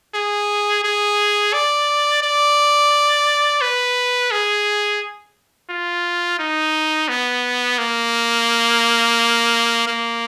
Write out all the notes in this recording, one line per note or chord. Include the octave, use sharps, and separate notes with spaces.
G#4
G#4
D5
D5
B4
G#4
F4
D#4
B3
A#3
A#3